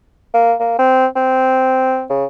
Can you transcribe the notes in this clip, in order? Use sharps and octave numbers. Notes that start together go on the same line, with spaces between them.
A#3
A#3
C4
C4
C#3